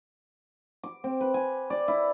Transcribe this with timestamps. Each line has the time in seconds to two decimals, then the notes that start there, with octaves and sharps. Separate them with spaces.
0.83 D6
1.04 C4
1.21 B4
1.34 G#5
1.70 D5
1.88 E4